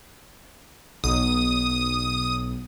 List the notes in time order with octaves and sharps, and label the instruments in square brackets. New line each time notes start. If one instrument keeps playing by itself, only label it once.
[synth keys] B1 [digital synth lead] D#6